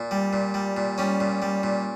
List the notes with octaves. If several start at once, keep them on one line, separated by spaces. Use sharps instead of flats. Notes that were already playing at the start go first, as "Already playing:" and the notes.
Already playing: A#2
G3
A#2
G3
A#2
G3 C#4
A#2
G3
A#2